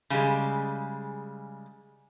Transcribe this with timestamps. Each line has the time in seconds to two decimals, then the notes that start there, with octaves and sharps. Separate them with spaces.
0.10 C#3 G3 G#3